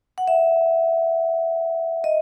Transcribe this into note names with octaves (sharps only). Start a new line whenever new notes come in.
F#5
E5
D#5